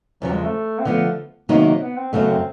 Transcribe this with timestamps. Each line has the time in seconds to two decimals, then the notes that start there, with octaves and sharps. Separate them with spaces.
0.22 E2 C#3 F3 F#3
0.32 G#3
0.43 A3
0.79 C4
0.85 D3 F3 A3 B3
1.49 C3 D#3 F#3 A#3 B3 D#4
1.81 B3
1.97 C4
2.13 F#2 C#3 F#3 A3 B3
2.29 C4